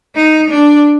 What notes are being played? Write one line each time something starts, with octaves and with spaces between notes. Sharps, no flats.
D#4
D4